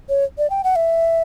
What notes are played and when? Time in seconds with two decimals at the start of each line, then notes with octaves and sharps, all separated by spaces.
0.09 C#5
0.38 D5
0.50 G5
0.64 F#5
0.76 E5